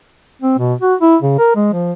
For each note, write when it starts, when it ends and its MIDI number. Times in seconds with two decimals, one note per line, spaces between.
0.42 0.56 60
0.58 0.74 47
0.81 0.95 66
1.01 1.17 64
1.22 1.35 49
1.39 1.53 70
1.56 1.73 56
1.73 1.93 53